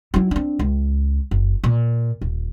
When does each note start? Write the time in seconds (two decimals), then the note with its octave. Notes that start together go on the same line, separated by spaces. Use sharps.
0.14 F#3 E4
0.31 C4 D4
0.59 C#2
1.31 F#1
1.64 A#2
2.21 D#1